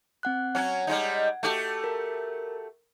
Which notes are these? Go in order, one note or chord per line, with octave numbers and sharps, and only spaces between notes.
C4 F#5 F#6
F#3 C#4 F#5 G#6
G3 G#3 D#4
A3 F#4 G4
A#4